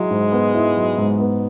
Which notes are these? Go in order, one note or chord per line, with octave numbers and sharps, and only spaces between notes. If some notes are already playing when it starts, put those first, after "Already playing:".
Already playing: F#3 G#3 E4
G#2
B3
E4
F#3
G#2
B3